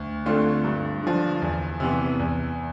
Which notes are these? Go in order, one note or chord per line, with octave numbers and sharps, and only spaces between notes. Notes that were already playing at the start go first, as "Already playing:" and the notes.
Already playing: D2
D3 A3 C4 F4
G2
D3 F3
E2
C3 E3 B3
E2